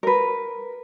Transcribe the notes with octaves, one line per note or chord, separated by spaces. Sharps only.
A#4 B4